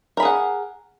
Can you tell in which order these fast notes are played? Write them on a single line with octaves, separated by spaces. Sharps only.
A#4 B5 G#4 F#5